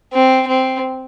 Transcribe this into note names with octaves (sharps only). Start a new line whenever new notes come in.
C4
C4